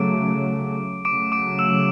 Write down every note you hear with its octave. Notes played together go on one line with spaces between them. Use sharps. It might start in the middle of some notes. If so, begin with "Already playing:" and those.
Already playing: C#3 F#3 A3 D6 D7
C#3 F#3 A3 D6 D7
D6 D7
E6 E7